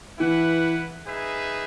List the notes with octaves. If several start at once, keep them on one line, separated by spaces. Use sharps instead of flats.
E3 E4 B4 F#5
D#4 G#4 B4 E5